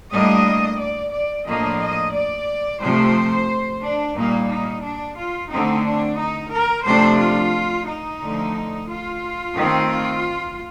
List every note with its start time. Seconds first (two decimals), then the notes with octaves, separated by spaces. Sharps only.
0.12 A2 G3 A#3 D4 D#5
0.80 D5
1.14 D5
1.46 A2 F3 A#3 D4 D#5
1.81 D#5
2.15 D5
2.81 C3 F3 A3 C5
3.83 D4
4.16 A#2 G3 A#3 D#4
4.50 D#4
4.83 D4
5.18 F4
5.51 D3 A3 C4 D#4
5.85 D4
6.18 D#4
6.53 A#4
6.86 C3 F3 A3 D4 C5
7.19 F4
7.87 D#4
8.21 D3 F3 A3
8.89 F4
9.56 D#3 A3 C4
9.90 F4